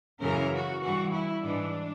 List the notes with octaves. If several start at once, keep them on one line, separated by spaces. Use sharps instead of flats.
F#2 C#3 E3 A#4
F#4
G2 E3 F#4
E4
G#2 E3 D4